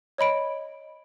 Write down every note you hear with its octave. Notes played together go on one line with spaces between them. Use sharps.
C#5 D#5 B5 D7